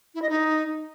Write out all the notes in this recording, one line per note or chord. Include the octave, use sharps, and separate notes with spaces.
E4
D#5
D#4